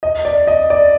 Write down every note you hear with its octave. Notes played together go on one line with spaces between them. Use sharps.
D#5
D5
D#5
D5